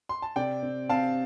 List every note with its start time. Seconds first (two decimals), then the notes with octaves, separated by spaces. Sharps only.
0.09 C6
0.22 A5
0.36 C3 D5 G5
0.63 C4
0.89 C4 F5 A5